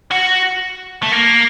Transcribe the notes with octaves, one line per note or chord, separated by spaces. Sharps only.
F#4
A3
A#3